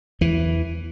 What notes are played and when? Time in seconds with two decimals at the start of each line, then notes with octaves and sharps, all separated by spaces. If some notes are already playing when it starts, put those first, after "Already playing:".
0.21 E2 E3